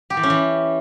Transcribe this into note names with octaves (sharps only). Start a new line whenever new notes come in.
G4
E3
C#4
E3